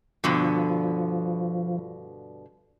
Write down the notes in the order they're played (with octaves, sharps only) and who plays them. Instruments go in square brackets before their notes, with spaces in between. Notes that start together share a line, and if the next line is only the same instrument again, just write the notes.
[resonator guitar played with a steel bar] G2 B2 D3 [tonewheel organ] F3